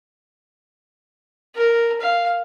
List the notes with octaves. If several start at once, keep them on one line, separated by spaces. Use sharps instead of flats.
A#4
F5